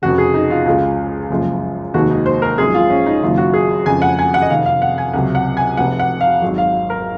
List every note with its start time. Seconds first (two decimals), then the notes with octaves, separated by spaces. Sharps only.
0.02 F1 F2 C#3 F#4
0.18 G#4
0.34 D#4
0.50 F4
0.66 C#2 C#3 G#3 F4
1.30 F#1 F#2 F3 G#3
1.94 F1 D#2 D#3 G#3 F#4
2.11 D#4
2.26 C5
2.42 A#4
2.58 G#1 F#2 F3 G#3 G#4
2.74 F4
2.90 C#4
3.06 D#4
3.23 F#1 F#2 D#3 F#3 F4
3.37 F#4
3.54 G#4
3.86 F2 C#3 F3 G#3 G#5
4.02 F#5
4.19 G#5
4.34 F#5
4.42 D#5
4.50 F1 F2 C3 D#3 F5
4.66 F5
4.82 F#5
4.98 G#5
5.13 C#2 C3 F#3 F#5
5.35 F#5
5.57 G#5
5.77 F1 F2 C3 F#5
5.99 F#5
6.21 F5
6.42 G#1 G#2 F#3
6.58 F5
6.90 A#4